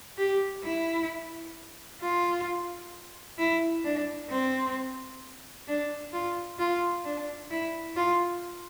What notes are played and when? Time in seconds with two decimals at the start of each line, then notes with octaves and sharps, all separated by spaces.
0.18 G4
0.64 E4
2.01 F4
3.39 E4
3.84 D4
4.30 C4
5.68 D4
6.13 F4
6.59 F4
7.05 D4
7.51 E4
7.96 F4